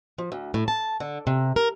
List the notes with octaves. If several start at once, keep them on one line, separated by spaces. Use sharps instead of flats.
F3
D2
A2
A5
D3
C3
A#4